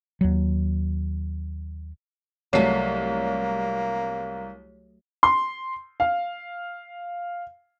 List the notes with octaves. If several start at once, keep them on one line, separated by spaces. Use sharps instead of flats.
D#2 F#3
C2 F#3 A3 A#3 C#5 C7
C6
F5